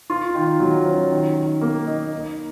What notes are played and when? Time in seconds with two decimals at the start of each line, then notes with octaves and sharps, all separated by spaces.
0.10 F4
0.35 D#3
0.60 F#3
0.86 C#4
1.10 D#3
1.36 D#3
1.61 A#3
1.87 D#4
2.12 D#4